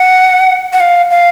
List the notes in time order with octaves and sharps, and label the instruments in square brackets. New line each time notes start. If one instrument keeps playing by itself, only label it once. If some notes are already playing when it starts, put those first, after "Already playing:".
Already playing: [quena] F#5
F#5
F5
F5